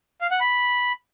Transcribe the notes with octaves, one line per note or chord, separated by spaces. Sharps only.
F5
F#5
B5